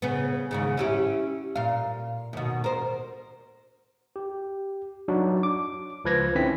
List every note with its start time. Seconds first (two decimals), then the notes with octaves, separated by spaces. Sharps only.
0.02 C#3 B3
0.51 D#2 G#2 C#3
0.77 C#4 E4 G4
1.56 A#2 F5
2.33 D#2 B2
2.64 A#4 C5
4.16 G4
5.08 F#3 D4 D#4 F#4
5.43 D6
6.04 C#2 F3 B4 G#6 A#6
6.35 D3 C4 C#4 E4 B6